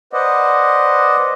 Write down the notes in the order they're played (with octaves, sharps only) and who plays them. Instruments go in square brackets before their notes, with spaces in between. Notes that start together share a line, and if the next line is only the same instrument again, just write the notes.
[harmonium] B4 C5 D5 D#5 F#5